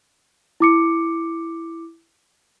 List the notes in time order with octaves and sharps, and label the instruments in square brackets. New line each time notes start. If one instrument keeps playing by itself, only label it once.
[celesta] E4 D6 C#7